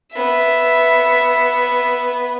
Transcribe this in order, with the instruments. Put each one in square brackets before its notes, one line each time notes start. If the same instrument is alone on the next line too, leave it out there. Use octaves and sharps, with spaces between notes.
[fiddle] B3 [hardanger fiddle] E5